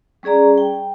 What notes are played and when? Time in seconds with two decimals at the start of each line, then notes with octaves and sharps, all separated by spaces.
0.23 G3 C#4 G#4 D5 A#5
0.58 G5